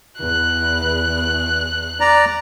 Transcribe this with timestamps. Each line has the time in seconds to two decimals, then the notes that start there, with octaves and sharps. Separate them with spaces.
0.19 E2 F#6
2.00 D5 A#5